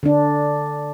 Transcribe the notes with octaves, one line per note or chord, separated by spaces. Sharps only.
D3 D4